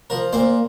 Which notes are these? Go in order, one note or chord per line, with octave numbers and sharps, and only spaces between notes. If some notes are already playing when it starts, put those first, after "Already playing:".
F3 A#4
A#2 C5